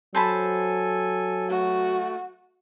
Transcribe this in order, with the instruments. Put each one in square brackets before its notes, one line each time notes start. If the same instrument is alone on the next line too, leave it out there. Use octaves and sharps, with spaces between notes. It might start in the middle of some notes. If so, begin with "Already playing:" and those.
[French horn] F#3 [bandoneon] A4 G#5 [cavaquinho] C5 A5 B5
[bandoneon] A3 [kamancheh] F#4